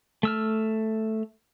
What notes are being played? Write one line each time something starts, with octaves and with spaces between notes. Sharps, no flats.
A3 E6 F6